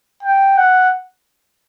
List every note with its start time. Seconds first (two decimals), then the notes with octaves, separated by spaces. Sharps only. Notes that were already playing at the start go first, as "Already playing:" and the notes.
0.23 G5
0.57 F#5